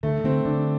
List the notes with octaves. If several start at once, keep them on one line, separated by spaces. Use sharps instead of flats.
D3 A3
D3 C4
D3 D4